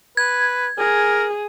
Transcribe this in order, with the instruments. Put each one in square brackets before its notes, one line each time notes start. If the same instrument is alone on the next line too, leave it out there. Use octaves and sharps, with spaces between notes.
[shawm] B4 [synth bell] G#6
[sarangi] G#4 [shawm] A#4